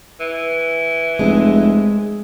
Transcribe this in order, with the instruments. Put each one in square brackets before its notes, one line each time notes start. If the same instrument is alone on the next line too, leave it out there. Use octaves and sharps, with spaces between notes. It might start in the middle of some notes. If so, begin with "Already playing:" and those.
[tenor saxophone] E3
[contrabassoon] F1 [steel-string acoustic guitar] G#3